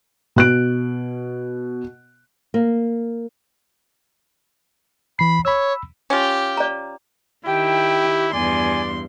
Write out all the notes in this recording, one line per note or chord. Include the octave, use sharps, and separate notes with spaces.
B2 F#6 D7
A#3
E3 B5 C7
C#5 B5 E6
C#4 F4 G4 G5
D5 A#5
D#3 E4 G4 G5
E2 G2 D5 G#5 C6